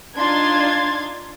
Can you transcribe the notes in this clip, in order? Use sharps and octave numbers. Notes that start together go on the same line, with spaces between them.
D4 D#4 F4 C6 G#6 A6